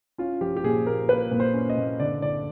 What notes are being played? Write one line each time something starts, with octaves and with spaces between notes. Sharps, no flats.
C#4 F4
F3 G4
G4
A#2 G#4
A#3 A#4
A#3 B4
A#2
C5
C#4
D#5
A#2
D3 D5
D3 D5